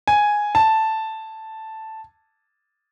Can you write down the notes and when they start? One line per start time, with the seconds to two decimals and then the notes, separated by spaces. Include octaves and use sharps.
0.08 G#5
0.55 A5